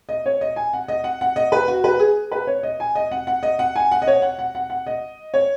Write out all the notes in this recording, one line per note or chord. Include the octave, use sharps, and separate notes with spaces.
D#5
C#5
D#5
G#5
F#5
D#5
F#5
F#5
D#5
B4
F#4
B4
G#4
B4
C#5
D#5
G#5
D#5
F#5
F#5
D#5
F#5
G#5
F#5
D#5
C#5
F#5
F#5
F#5
F#5
D#5
C#5